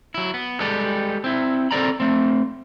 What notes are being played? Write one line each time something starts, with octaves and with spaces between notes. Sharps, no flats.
F#3 E4
B3
G3 G#3 G4 A4 B4
C4 E4
C4 A4 A#4 D5 A#5 B5
A3 C4